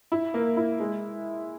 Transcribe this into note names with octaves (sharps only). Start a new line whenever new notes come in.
E4
A#3
E4
G#3